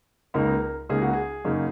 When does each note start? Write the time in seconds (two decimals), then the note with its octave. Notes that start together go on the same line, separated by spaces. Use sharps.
0.34 C#2 C#3 A#3 D#4 A#4
0.89 C#2 C#3 A#3 D#4 G#4
1.02 F#4
1.13 G#4
1.45 F#2 C#3 A#3 D#4